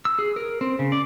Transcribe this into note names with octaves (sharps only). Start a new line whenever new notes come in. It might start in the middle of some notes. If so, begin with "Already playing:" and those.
E6
G#4
A#4
C4
C#3
D5